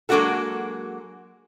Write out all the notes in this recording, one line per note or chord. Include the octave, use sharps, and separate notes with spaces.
F#3 G#3 A#3 D4 F#4 A4